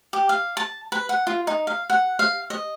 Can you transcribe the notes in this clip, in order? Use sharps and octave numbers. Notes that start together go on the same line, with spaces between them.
G4
F5
A5
B4
F#5
F4
D#4
F5
F#5
F5
D#5